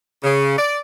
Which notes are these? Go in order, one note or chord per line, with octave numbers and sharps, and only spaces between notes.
C#3
D5